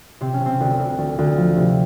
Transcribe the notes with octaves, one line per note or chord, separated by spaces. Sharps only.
C3 C4
C#4
C3
C4
D2
D2
D2
D2
F3
C3